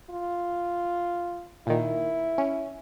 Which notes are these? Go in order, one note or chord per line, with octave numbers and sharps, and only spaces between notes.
F4
A#2 D#3 E4
C#4